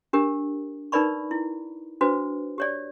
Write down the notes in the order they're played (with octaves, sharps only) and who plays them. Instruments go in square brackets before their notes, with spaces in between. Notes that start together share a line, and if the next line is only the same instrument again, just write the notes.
[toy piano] D4 G4 A#4
D#4 A#4 B4 D5 B5 C#6
E4
D4 F#4 B4 C5
G4 C#5 D5